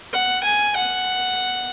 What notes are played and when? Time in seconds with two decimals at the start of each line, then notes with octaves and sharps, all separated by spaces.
0.13 F#5
0.44 G#5
0.76 F#5